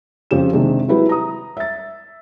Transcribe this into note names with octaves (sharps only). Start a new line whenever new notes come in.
F2 C#3 G4 E7
C3 D#3 G#3 D4
F#3 G#3 E4 G4 B4
A#5 D#6
E5 A6